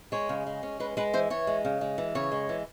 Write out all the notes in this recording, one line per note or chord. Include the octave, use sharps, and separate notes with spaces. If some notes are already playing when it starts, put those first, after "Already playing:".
G#3 C#5
C#3
G#3
C#4
G#3 B4
G#3 B4
E3 C5
E3 C#5
G#3
C#3
G#3
E3
C#3 C#5
G#3
E3